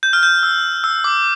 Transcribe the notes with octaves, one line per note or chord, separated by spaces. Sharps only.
G6
F6
G6
E6
E6
D6